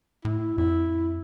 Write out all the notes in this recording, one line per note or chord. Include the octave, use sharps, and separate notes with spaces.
A2 E4
F2 E4